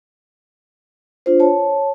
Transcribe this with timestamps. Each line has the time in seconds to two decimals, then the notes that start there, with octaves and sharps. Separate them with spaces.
1.26 D4 F4 C5
1.40 C#5 A5